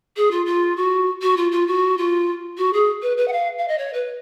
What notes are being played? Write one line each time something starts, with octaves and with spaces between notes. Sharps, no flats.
G#4
F4
F4
F#4
F#4
F4
F4
F#4
F4
F#4
G#4
B4
B4
F#5
F5
F5
D#5
C#5
B4